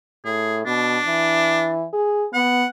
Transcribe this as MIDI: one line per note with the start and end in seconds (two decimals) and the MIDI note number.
0.25 0.65 45
0.25 0.59 68
0.65 0.97 47
0.65 1.71 62
1.06 1.84 52
1.93 2.25 68
2.33 2.64 59
2.33 2.67 78